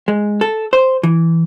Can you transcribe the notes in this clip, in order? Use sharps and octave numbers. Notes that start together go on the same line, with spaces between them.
G#3
A4
C5
E3